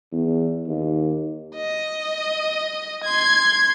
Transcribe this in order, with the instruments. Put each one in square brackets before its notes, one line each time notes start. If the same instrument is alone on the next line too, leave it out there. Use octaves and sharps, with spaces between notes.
[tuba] E2
D#2
[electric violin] D#5
C6 G#6